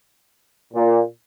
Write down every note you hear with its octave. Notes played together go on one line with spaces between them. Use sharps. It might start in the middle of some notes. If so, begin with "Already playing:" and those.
A#2